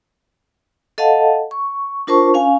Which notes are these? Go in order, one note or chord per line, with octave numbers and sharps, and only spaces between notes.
A4 D#5 F5 F#5 A5
C#6
D4 F4 A#4 C5 A5 C#6
C#4 F5 G#5